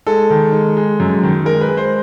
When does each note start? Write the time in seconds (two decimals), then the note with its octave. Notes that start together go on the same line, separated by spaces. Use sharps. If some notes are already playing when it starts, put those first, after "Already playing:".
0.07 G#3 A4
0.30 D#3
0.52 G#3
0.77 G#3
1.00 F#2
1.23 D#3
1.45 G#3 A#4
1.61 B4
1.69 G#3
1.77 C5